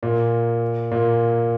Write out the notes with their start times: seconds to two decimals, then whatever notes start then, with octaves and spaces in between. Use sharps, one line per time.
0.03 A#2
0.91 A#2